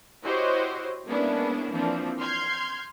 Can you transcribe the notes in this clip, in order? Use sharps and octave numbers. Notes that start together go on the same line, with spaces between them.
E4 F#4 G4 C5 C#5 D#5
G#3 A#3 B3 C#4 D4 E4
E3 F3 A#3 C4 D4
C6 F6 G6 G#6 C7